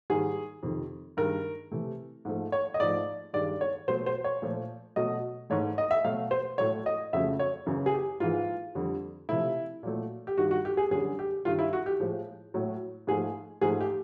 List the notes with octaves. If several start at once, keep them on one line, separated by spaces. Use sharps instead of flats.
G#2 D#3 G3 G#4
F2 C3 D#3
G2 D#3 G#3 A#4
C3 E3 A3
G#2 F3 A3
C#5
D#5
G#2 F3 A3 D5
G2 D#3 G#3 D5
C#5
B2 F#3 A3 C5
C5
C#5
A#2 F3 A3
B2 F#3 A3 D#5
G#2 E3 A3 C#5
D#5
E5
B2 F#3 A3 F5
C5
A2 F#3 A3 C#5
D#5
F2 C#3 F#3 A3 E5
C#5
F#2 C#3 E3
G#4
G4
G#2 E3 G#3 F4
F2 D3 G3
C3 F3 A3 E4
A#2 F#3 A3
G4
G2 D#3 G3 F#4
F#4
G4
G#4
F#2 D3 G3 G#4
G4
G2 D#3 G3 F4
E4
F#4
G4
A2 F3 G#3
A2 F#3 A3
G#2 F3 A3 G#4
G#2 F3 A3 G#4
G4